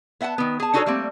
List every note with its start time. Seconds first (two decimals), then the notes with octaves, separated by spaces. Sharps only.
0.21 B3 E5 F#5 G#5 A5
0.38 D#3 B3
0.60 G#4 A5
0.74 D4 D#4 F#4 G#4 A4 C#5
0.86 G3 A3 A#3 C4